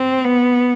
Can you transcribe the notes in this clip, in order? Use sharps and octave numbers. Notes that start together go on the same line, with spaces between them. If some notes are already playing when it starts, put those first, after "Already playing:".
Already playing: C4
B3